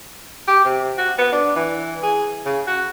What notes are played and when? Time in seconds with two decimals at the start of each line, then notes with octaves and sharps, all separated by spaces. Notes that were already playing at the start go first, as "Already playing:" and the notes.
0.48 G4
0.65 C3
0.98 F#4
1.18 B3
1.32 D4
1.56 E3
2.03 G#4
2.46 C#3
2.67 F#4